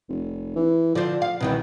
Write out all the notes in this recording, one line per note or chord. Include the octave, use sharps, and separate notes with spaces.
F1
E3
D3 F3 C4
F5
C2 B2 D#3 E3